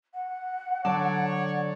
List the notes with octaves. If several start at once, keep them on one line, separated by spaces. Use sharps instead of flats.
F#5
D3 F#3 C#5 D5 A5